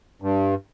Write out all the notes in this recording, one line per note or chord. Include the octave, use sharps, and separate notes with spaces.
G2